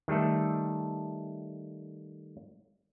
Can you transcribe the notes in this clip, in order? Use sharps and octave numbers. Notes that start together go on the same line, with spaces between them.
D#3 G3 A3 A4